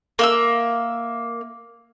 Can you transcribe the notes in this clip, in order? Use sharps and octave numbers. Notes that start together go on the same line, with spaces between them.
A#3 E5 E6